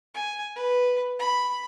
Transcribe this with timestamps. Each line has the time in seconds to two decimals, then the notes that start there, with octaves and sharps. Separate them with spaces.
0.14 G#5
0.56 B4
1.19 B5